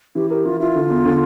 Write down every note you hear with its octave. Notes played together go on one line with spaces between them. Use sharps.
E3 G4
G4 A#4
E3 F4
E4 F4
D3
E2
D3